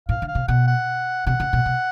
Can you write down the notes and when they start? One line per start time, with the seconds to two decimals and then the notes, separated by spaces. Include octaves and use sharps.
0.09 A2 F5
0.22 D3
0.28 F5
0.35 C3
0.48 B2 F#5
0.67 F#5
1.26 C3 F#5
1.40 C#3
1.53 B2
1.66 C3